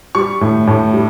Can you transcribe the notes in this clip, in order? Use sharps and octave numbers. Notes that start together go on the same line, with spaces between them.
G3 C#6
A2
A2
G3